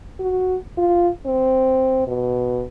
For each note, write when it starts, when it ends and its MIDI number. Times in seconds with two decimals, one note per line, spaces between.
0.20 0.57 66
0.77 1.09 65
1.26 2.05 60
2.07 2.64 47